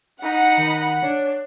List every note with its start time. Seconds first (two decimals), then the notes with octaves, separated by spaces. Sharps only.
0.22 D#4 F#5 B5
0.57 D#3
1.03 D4 C#5